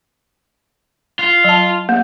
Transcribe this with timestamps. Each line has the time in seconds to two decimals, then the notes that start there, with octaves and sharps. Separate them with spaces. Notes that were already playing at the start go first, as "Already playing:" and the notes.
1.19 F4
1.44 F#3 A5
1.89 A#3